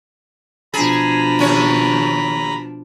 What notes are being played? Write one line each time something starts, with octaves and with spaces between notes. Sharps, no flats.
B2 F3 D4 G#4 A#5 B5
D#2 C#4 C#5